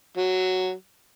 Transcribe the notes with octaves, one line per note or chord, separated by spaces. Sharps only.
F#3